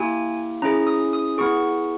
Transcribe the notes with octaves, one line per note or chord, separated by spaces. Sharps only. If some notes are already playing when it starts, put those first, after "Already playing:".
Already playing: A#3 E4 G4 G#5
C#4 E4 G#4 A#5
D#6
D#6
B3 E4 G#4 C#6